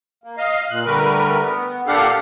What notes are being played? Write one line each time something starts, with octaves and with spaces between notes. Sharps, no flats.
A#3
D#5 F5
A#2 F#6
D3 G3 A3 A#4 B4
B3
A#2 D4 G4 A4 F5 F#5